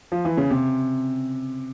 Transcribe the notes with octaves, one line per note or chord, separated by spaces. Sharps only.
F3
E3
C#3
C3